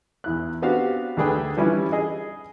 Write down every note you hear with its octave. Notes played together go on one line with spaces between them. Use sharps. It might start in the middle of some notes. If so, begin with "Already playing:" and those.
E2 E4 F#6
B3 C4 D4 F#4 G4 F5
D2 A3 D4 G#4 B4 G5
E3 F3 G3 C#4 D4 E4
G#4 D#5